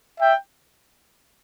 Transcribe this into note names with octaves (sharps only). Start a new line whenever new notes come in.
E5 G5